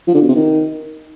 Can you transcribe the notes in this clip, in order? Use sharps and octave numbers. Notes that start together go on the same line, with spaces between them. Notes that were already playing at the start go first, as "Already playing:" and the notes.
F3
D3
B2
C3
D#3